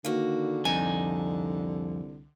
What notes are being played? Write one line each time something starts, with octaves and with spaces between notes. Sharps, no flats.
D3 D#3 A#3 F#4
C2 F2 D#4 G#5